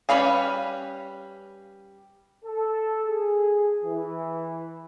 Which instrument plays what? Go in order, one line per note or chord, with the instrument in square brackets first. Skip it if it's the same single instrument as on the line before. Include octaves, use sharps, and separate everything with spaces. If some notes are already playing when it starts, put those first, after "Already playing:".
[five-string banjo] G3 C#4 B4 F5 G#5
[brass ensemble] A4
G#4
E3